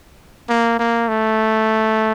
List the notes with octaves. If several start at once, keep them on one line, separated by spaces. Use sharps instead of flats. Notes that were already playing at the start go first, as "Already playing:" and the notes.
A#3
A#3
A3